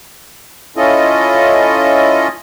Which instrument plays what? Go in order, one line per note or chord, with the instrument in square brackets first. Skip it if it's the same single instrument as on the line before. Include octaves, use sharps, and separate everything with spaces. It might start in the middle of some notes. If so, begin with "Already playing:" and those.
[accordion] C#4 E4 F4 A4 D#5